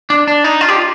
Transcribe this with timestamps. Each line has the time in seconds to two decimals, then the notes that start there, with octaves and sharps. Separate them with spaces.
0.10 D4
0.28 D4
0.44 D#4
0.61 F4
0.69 G4
0.77 F4